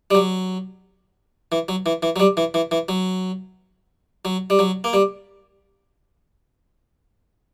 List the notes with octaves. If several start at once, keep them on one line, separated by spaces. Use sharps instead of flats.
G3
F#3
E3
F#3
E3
E3
F#3
G3
E3
E3
E3
F#3
F#3
G3
F#3
A#3
G3